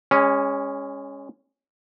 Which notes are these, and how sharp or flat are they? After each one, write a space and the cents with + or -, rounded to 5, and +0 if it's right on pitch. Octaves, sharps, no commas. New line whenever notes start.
G#3 -25 C#4 +0